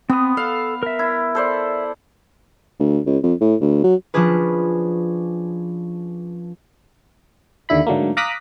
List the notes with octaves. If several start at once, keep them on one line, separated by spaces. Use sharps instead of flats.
B3 C4 D#6
A4 F5
A#4 E5
E4
A4 C5 D5
D2
C#2
F2
A2
D2
F#3
F3 C#4 D4 G#4 B4
D#2 D3 E4 B5
G#2 D3 F#3 A3 A#3
F5 A#5 D6 D#6 F#6 B6